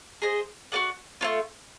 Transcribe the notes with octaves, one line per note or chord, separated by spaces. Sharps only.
G#4 C5 D#5
F#4 B4 D5 F#5
A3 C#4 F4